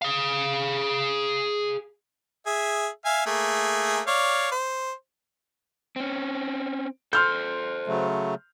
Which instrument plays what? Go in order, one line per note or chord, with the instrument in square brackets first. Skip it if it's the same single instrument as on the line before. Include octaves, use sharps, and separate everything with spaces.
[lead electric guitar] G#4 F5
[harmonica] G#4 E5
E5 F5 G#5
A3 A#3 G#4
C#5 D5 F5
C5
[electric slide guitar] C4 C#4
[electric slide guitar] A4 C5 [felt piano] C6 F6 G6
[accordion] C#3 F#3 A3